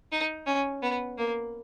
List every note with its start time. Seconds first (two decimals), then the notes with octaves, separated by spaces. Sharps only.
0.12 D#4
0.46 C#4
0.82 B3
1.18 A#3